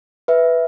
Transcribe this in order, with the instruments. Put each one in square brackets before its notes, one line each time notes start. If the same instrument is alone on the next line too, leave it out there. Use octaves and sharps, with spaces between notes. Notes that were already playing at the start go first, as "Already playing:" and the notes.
[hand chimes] B4 E5